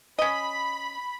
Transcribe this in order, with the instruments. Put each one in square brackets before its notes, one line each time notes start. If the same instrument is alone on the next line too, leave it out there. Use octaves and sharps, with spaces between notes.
[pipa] C#4 D#5 [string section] B5